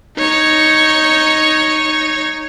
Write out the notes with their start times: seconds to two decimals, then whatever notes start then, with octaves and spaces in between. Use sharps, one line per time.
0.18 D#4 C#5